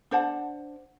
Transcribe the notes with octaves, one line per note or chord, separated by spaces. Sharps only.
D4 C5 F#5 A5